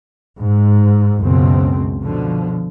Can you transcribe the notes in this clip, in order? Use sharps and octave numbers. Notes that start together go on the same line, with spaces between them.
G#2
C#2 F#2 B2 C4
B2 D3 F3